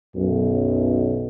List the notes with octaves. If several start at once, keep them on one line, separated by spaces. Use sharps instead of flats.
B1 F#2